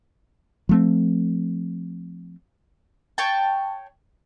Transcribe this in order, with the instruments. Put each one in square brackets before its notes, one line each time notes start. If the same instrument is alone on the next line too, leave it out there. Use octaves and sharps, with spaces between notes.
[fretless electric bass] F3 A3 C4
[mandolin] C#5 G5 A5